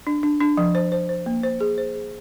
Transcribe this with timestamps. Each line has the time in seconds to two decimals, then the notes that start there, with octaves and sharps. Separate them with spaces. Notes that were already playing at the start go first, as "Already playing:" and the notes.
0.07 D4
0.23 D4
0.40 D4
0.57 F3
0.75 C5
0.92 C5
1.09 C5
1.26 A#3
1.43 C5
1.61 G#4
1.78 C5
1.95 G#4